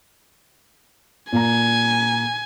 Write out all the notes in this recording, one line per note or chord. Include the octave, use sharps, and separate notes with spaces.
A#2 G#5 A#5